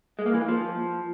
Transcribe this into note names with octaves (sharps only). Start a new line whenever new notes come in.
G#3
A#3
E3
A#3
F3